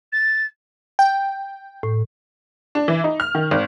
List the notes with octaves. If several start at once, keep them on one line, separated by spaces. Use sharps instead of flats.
A6
G5
A2
D4
E3
D#4
F6
D#3
G#1